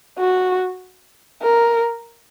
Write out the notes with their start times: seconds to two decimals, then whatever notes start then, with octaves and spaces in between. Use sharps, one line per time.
0.19 F#4
1.42 A#4